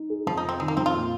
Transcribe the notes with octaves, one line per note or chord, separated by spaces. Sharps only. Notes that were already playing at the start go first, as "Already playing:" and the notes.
Already playing: D#4
G#4
F2 F3
D#4
C3
C4
D#3 G#3
A#3
F2 C4
F4
A#2